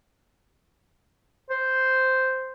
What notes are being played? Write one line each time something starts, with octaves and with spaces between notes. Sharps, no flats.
C5